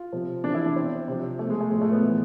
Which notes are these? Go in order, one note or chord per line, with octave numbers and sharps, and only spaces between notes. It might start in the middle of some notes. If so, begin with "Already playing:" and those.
Already playing: F4
C3 F3
C3 E3 D4
E4
D4
B2 C4
C3 F3
B2 A3
G#3
A3
A2 F3 G#3
A3
B3
A2 E3 B3